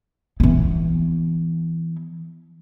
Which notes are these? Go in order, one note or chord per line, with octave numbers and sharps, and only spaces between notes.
E3 B3